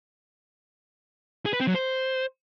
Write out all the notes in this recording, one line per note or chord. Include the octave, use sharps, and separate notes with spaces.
G#4
B4
C4
F#3
C5